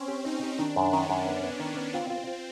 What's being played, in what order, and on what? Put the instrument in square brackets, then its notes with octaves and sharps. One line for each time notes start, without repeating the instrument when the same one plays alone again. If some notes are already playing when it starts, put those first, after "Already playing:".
Already playing: [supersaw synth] C4 C#4
[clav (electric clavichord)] G4
[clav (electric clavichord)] C4 [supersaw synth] D#4
[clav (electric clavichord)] G4
[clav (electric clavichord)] D#3 [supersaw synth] D4
[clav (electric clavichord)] F#2
[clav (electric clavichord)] D#3 [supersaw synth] C#4
[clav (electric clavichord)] F#2
[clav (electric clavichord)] B3 [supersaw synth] C#4
[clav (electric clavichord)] B3
[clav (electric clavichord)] D#3 [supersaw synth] C#4
[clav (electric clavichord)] B3
[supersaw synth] C4 [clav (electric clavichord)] F4
[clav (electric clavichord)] F4
F4